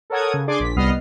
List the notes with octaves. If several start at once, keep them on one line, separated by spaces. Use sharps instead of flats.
A4 A#4 C#5 F#5 D#6 G#6
C#3
D4 G#4 D5 G#5 C6 D6
A#1 B6
C2 G3 B3 D#5 F6 C7